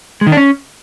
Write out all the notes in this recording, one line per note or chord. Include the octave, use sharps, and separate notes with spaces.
G#3
D#3
D4
C#4